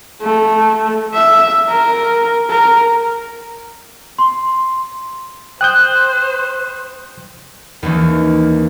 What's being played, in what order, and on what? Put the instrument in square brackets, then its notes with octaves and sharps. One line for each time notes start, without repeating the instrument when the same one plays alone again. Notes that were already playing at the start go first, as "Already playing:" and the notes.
[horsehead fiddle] A3
E5
A#4
A#4
[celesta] C6
[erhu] C5 [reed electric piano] G5 D#6 G6 [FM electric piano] F#6
[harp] D#2 D#3 E3 C#4